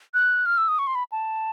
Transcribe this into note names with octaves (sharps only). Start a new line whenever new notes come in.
F#6
F6
E6
D#6
C#6
C6
B5
A5